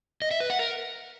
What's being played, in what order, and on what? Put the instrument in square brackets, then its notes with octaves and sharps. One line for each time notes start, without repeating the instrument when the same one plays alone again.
[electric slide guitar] D#5
E5
B4
F#5
A#4